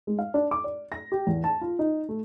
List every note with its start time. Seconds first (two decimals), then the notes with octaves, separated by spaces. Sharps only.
0.07 G#3
0.19 F5
0.34 D4
0.51 D6
0.64 D5
0.92 A#6
1.12 G4
1.27 E2
1.44 A5
1.61 F4
1.79 D#4
2.09 A3